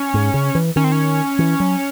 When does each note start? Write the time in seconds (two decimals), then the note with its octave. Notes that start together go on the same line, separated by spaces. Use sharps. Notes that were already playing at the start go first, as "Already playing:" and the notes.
Already playing: C#4
0.14 G#2
0.34 C#3
0.55 E3
0.76 D#3 C#4
0.84 C4
0.92 C#4
1.39 E3
1.60 F#3